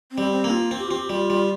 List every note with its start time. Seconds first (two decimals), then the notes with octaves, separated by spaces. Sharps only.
0.12 C4
0.18 G3
0.31 C4
0.44 A#3
0.51 F4
0.71 C4
0.79 G4
0.88 C4 F4
0.97 G4
1.10 G3 F4
1.30 G3